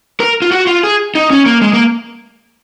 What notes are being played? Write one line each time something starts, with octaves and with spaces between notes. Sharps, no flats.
A#4
F4
F#4
F4
G#4
D#4
C#4
A#3
G#3
A#3